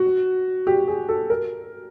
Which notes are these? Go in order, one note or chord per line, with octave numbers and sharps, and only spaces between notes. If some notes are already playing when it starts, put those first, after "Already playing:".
Already playing: F#4
G4
G#4
A4
A#4